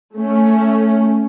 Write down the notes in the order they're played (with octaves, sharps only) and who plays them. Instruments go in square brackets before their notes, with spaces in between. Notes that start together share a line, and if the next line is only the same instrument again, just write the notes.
[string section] A3 C#4